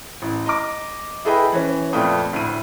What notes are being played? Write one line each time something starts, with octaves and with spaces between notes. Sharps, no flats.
A1
D#5 A#5 D6
E4 G#4 A4 B4 D#5 G5
E3 C#4
F2 A#2 A3 B4 G5 D#6
D2 A2 D#7